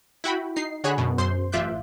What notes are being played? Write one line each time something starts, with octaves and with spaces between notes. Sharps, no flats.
E4 F#4 G5 B5
D#4 C7
D3 F#4 G#4 C#5 B5 F#6
F#2 B2
F#2 C5 C6
A1 F4 E5 D6 F#6 G6